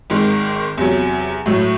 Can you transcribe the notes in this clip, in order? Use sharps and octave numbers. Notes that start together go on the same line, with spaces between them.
G#1 G#2 D#3 G#3
E2 C3 F#3
A2 F#3 A3